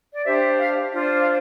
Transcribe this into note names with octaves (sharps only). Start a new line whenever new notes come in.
D5
D4 G4 C5 E5
F5
D4 F4 C5
F5